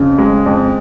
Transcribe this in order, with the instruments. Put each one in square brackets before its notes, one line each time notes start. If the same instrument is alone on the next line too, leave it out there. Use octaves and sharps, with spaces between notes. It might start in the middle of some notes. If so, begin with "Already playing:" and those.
Already playing: [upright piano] F2 C#3
G#3
F2